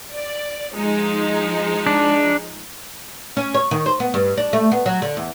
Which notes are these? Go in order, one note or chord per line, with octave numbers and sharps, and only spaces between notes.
D5
F3 G#3 D#4
D4
C#4
C#5
D#3
C5
B3
G2
D4
A3
B3
F#3
D3
E2